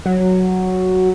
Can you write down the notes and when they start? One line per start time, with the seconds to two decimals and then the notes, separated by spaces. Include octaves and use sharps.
0.05 F#3